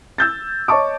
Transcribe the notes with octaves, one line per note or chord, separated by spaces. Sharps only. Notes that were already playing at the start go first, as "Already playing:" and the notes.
E6 G6 A6
C#5 D#5 A5 C#6 D6